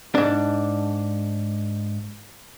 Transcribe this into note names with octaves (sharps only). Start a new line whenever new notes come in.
G#2 D4